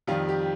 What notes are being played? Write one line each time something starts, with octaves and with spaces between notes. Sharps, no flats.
F2 D#3 G3 F4
G4